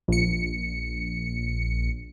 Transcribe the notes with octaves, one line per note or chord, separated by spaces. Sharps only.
A#1 C#7